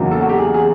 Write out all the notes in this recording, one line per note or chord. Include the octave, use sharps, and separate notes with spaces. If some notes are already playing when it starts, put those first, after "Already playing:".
Already playing: E2 C#3 F#3 A#3 D#4
A4
F#4
G4
G#4
G#4